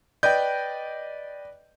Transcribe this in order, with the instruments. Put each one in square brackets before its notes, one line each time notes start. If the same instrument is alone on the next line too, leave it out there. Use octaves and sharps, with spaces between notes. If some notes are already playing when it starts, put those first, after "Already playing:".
[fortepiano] B4 D5 D#5 [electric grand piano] G5 G6